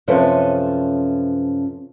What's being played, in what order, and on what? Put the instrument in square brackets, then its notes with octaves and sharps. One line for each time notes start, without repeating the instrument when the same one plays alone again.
[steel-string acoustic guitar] F#2 C3 F3 C#4 A4 B4